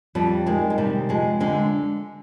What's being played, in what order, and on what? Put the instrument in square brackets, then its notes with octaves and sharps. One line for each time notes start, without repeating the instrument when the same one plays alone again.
[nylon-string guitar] F2 G3
D#3 G#3
G#3
C3 G3
F2 G#3
D3 G#3